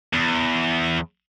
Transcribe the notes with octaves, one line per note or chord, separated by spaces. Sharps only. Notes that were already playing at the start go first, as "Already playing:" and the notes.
E2